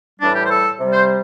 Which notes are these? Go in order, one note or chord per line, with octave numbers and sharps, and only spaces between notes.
A2 E3 G3 D4
G4
C5
A4
C3 G3
C5